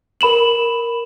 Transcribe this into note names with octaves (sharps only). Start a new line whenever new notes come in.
A#4 B5 E7 F#7